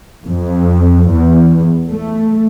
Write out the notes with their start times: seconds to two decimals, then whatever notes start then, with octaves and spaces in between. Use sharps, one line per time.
0.25 F2
1.12 E2
1.90 A3